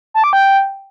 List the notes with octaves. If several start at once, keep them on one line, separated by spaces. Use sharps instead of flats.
A5
D6
G5